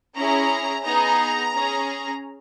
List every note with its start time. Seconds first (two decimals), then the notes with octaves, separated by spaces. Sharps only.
0.17 C#4 E4 G#4 A#5
0.85 B3 D#4 G#4 A#5
1.54 C#4 G#4